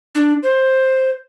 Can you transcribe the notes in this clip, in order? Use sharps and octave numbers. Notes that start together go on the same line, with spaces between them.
D4
C5